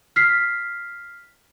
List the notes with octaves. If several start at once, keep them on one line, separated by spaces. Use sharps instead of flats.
F6 B6 C7